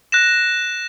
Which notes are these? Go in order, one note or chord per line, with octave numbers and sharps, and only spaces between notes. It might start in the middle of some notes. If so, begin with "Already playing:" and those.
F#6 A#6 E7